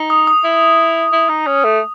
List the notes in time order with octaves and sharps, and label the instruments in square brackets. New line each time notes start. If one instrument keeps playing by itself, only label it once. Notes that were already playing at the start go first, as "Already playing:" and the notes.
Already playing: [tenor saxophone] D#4
[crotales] D#6
D#6
[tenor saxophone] E4
E4
D#4
C#4
A3